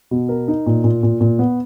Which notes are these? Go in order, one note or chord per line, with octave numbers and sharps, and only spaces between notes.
B2
A#4
D#4
A#2
A#2
A#2
A#2
B3